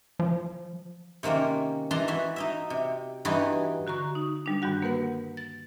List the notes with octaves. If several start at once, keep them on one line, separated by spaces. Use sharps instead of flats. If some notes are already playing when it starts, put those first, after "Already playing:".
F3
C3 D#3 A#3 C4 C#4
E3 D4 D#4 A5 A#5 C6
E3 F#4 E5
D#4 D#5 E5
C3
G2 E3 B3 D#4 F#4 G#5
D3 F#4 A#5 C#6
D#4
G3 D4
G2 D#3 G3 F#4 F#5
A#3 A#4 B4 F#5
A6